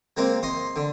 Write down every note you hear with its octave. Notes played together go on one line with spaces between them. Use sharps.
G#3 A#3 C4
D#5 C6
D3